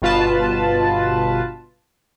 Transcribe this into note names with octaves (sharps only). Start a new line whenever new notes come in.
G1 B2 F4 B4 A5